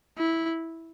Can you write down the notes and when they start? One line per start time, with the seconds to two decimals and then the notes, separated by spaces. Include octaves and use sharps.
0.18 E4